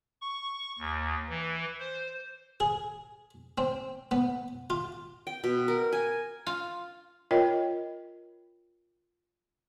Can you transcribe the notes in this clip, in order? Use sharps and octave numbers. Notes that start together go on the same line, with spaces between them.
C#6
D#2
E3
C5
G#4
C4
B3
F4
G5
B2
A#4
G#5
F4
F4 A#4 C#5 D#5 G5